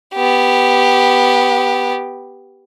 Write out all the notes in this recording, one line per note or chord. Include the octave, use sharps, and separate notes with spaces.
B3 G4